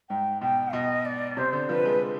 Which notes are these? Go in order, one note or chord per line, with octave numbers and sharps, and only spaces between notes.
G#2 G5
B2 G5
B2 D#5
D5
C3 C5
D3
F3 B4
G#3